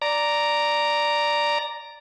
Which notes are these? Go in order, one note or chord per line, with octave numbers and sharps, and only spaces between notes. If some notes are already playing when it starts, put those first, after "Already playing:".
D5 A#5